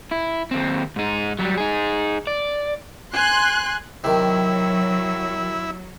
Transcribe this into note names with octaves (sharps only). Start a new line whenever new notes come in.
E4
D#2 C4
G#2 D#4
F#3 G3
D#4 G#4
D5
G#5 C6 F#6
C3 D#3 F#3 E4